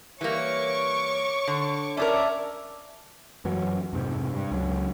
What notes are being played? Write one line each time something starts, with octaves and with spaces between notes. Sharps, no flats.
E3 G3 A#3 C#5 C#6 D6
D3
C#4 D4 A#4 D5 E5 A5
F#2 E3 F#3
F2 G#2 C3
G2
C#2 F#3